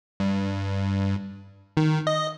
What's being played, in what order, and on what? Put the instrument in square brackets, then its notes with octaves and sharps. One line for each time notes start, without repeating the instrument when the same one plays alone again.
[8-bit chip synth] G2
D#3
D#5